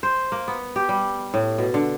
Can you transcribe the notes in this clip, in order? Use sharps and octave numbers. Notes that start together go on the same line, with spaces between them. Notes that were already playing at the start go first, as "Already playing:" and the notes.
C5
A#3
B3
G4
G3
A2
B2
D3